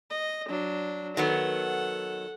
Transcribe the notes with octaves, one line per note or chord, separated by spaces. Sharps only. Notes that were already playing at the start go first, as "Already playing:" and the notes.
D#5
F#3 D4
D#3 F#3 B3 A4 F#5